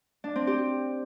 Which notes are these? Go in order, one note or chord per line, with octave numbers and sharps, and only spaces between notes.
D4
C4
G4